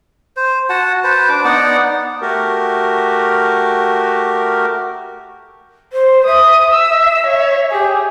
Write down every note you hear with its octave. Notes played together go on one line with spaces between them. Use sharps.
C5
F#4 F#5 A5
B4 C5 A5
D4 D6
B3 D#4 D5 F#5
A3 F#4 G4 A#4
C5
E5 D#6
E6
C#5
G4 G#4